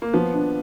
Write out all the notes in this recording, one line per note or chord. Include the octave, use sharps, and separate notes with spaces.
A#3
F3 B3
D4